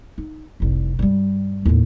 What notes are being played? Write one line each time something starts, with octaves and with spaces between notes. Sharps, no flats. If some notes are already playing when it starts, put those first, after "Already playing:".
D#4
F1 C2
G2 G3
D#2 A2